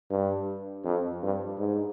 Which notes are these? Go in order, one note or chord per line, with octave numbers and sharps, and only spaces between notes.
G2
F2
G2
G#2